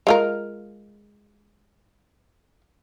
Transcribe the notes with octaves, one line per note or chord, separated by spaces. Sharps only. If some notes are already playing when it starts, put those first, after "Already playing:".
G#3 F4 A#4